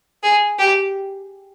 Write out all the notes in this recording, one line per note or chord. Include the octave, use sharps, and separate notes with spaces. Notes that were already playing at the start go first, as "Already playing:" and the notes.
G#4
G4